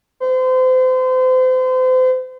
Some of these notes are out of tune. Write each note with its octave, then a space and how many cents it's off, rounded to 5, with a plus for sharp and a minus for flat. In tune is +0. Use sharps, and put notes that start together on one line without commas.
C5 -35